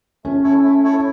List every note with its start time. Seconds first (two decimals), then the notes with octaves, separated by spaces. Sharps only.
0.25 A3 C#4
0.44 E4 A4 C#5
0.64 A3
0.83 E4 A4 C#5